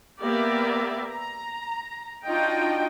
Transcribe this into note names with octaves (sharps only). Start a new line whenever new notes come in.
A#3 B3 G4 A#4 D5 E5
A#5
D4 D#4 F4 F#4 D#5 G5